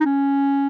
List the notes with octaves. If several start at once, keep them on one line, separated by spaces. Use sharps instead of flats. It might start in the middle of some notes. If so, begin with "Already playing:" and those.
D#4
C#4